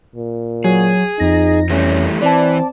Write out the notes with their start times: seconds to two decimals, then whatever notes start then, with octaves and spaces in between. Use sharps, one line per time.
0.15 A#2
0.64 F#3 G#4
1.20 F2 D#4 A#6
1.70 E3 G3 A3 C#4
2.22 E3 C4 D5 A5